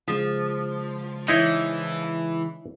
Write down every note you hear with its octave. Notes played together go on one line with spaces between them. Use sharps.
C#3 F3 G#3
E3 D#4 E4 C#5